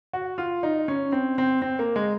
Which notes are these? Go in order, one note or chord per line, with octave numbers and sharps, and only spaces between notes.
F#4
F4
D#4
C#4
C4
C4
C4
A#3
G#3